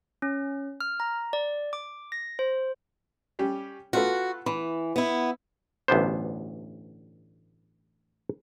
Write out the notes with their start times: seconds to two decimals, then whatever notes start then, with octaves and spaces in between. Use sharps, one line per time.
0.22 C#4
0.81 F6
1.00 A#5
1.33 D5
1.73 D6
2.12 A#6
2.39 C5
3.39 G3 C#4 G4
3.93 F4 F#4 A4 B4
4.46 E3 B5
4.96 B3 E4
5.88 A1 D2 G2 B3 D4 C5